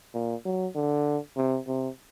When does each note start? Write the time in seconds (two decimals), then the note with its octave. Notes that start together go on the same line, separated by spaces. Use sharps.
0.14 A#2
0.45 F#3
0.75 D3
1.37 C3
1.67 C3